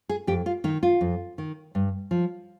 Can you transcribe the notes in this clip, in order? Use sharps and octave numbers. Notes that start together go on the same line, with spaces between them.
G#4
F2 G4
F4
D#3 D#4
F4
F2
D#3
G2
F3